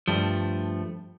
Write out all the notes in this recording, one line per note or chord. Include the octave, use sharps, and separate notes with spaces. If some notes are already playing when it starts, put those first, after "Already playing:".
G2 F3 A3